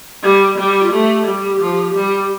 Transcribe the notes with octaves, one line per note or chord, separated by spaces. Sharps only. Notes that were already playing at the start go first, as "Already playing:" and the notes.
G3 G4
G4
G3
G4
F4
A3 G4
G3
F3
G3